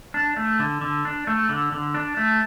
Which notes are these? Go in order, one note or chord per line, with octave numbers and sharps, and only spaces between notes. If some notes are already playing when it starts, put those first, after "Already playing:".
D4
A3
D3
D3
D4
A3
D3
D3
D4
A3